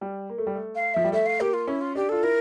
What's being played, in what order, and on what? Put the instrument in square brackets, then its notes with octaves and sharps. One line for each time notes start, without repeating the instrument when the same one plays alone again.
[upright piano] G3
A#3
A3
G3
A3
[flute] F5
[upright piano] F3 [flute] E5
[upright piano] G3
[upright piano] A3 [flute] E5
[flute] F5
[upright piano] A#3 [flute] G4
[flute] F4
[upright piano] C#4 [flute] E4
[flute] F4
[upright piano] D4 [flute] G4
[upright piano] F4 [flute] A4
[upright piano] E4 [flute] A#4